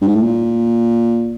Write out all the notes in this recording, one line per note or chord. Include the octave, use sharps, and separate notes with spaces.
G2
G#2
A2
A#2